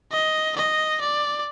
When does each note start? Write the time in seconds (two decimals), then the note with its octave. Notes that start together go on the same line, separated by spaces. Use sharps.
0.12 D#5
0.56 D#5
1.01 D5